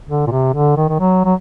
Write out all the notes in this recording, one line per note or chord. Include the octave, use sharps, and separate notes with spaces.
D3
A#2
C3
D3
D#3
D#3
F#3
F#3